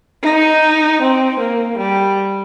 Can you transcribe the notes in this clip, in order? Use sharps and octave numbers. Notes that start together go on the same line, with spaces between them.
D#4
C4
A#3
G3